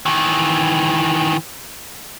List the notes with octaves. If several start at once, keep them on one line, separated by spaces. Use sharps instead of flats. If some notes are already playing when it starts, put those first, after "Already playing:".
D#3 E3